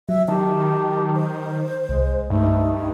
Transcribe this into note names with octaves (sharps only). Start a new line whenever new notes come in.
F#3 E5
D#3 G4 A5
C5
C2 G#3
G2 A3 D#4